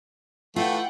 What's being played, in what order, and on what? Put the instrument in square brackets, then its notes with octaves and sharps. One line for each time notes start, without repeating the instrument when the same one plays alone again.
[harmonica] E3 A3 [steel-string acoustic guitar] F4 [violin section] F#5 G5